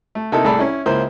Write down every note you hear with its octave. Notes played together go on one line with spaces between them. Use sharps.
A3
C3 A#3 D#4 E4 A4
C2 A2 G#4 A4 D5 B5
C#4 E4
C#2 A#3 E4 C5